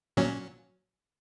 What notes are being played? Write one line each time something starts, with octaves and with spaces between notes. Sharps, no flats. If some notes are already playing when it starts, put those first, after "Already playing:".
A#2 F#3 C#4